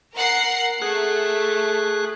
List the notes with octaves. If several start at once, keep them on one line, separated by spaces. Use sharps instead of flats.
A#4 F#5 C7
A3 G#4 F#6